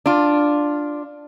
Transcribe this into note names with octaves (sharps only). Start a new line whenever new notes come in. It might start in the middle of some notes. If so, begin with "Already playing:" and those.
D4 F4